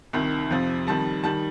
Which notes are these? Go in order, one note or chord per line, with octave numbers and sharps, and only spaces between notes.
C2 C3 D#3
F2 C3 F3
F2 D#3 G3 A5
D#3 G3 A5